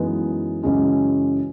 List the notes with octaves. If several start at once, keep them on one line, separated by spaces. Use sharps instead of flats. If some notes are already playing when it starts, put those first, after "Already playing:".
Already playing: F#2 E3 G#3 B3 D#4
F#2 C#3 E3 G#3 C#4